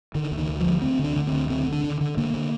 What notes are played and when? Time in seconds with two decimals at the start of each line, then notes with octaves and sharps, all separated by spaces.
0.15 D3 D#3
0.31 D2
0.38 D#3
0.48 D3
0.60 F3
0.66 D2
0.82 D2 C4
0.99 D3
1.04 D4
1.16 D3
1.27 D2 C4
1.50 D3 C4
1.67 D3
1.72 D4
1.84 D3
2.01 D3
2.17 D3 A#3
2.34 D3